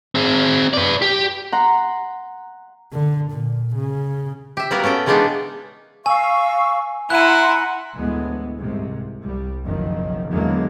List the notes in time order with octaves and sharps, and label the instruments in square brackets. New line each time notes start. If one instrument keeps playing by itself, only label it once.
[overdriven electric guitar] C4 G#4
B4 D5
G4
[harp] F#5 A#5 C6
[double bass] D3
A#2
C#3
[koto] G4 E5
G3 A#3 B3 F#4 A#4
B3 C#4 A4 G5
E3 G#3 A#3 B3 D4 D#4
[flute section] F5 C#6 E6 [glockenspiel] G#5
[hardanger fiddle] E4 [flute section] F#5 A#5 C6 [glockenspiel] F#6 D#7
[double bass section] D2 A2 E3 G#3 B3
C2 G#2 C3
C2 G3
F#1 B1 F#2 D#3 F3
E2 D3 D#3 F#3 G#3 A#3